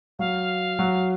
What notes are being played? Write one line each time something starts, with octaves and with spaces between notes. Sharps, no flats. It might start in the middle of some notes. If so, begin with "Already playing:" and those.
F#3 F5
F#3